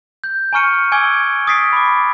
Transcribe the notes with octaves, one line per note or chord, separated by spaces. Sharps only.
G6
G#5 A#5 C#6 F6 C#7 D#7
G#5 D6 E6 G#6 D7 G7
D#6 A6 B6 C7 D7
B5 D6